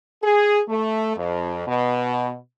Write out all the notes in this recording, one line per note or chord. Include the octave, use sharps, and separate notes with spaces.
G#4
A3
F2
B2